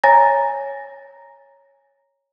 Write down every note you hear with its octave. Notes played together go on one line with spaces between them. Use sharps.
C#5 G#5 A#5 A6 A#6